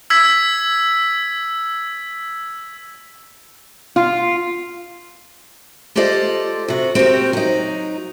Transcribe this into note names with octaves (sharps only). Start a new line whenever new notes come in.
E6 G#6 B6
F4
F4 G4 A4 C5 D5 D#5
C3 F#4
C4 F#4 G4 A#4
F#3 D#4